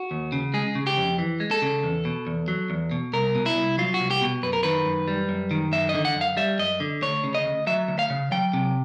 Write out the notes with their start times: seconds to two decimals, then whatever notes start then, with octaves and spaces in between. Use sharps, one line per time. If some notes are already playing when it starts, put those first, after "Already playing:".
Already playing: F#4
0.11 D#2
0.32 C#3
0.54 G#3 G#4
0.75 C#3
0.87 G4
0.97 F2
1.18 E3
1.40 G#3
1.51 A4
1.62 C#3
1.83 E2
2.05 B2
2.27 E2
2.48 F#3
2.70 E2
2.91 B2
3.13 C2 A#4
3.35 B2
3.46 E4
3.57 C2
3.78 F#3 F4
3.94 F#4
4.00 C2
4.10 G4
4.21 B2
4.43 F#2 B4
4.53 A#4
4.63 D#3 B4
4.86 F#2
5.08 G3
5.29 F#2
5.51 D#3
5.72 F#2 E5
5.89 D#5
5.94 D3
6.05 F#5
6.15 F#2
6.21 F5
6.37 G3 E5
6.59 F#2 D#5
6.80 D3
7.02 D2 C#5
7.24 C#3
7.35 D#5
7.45 D2
7.67 F#3 E5
7.88 D2
7.99 F5
8.10 C#3
8.32 F#3 G5
8.53 C3